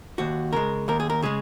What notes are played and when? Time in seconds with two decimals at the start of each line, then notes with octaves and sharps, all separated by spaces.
0.18 D#2 F#4
0.53 C#3 G#3 A#4
0.88 D#2 A#4
1.00 G#4
1.10 A#4
1.22 C#3 G#3 G#4